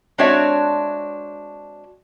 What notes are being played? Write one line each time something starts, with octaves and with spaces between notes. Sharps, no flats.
G#3 C4 D4 F#4 C#5 E5